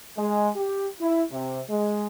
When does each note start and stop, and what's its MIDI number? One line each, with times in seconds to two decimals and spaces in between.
0.16 0.48 56
0.55 0.86 67
0.99 1.22 64
1.30 1.60 48
1.69 2.06 56